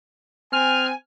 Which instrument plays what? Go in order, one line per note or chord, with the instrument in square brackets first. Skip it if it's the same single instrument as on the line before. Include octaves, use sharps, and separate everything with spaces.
[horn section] C4 G#5 [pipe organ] F6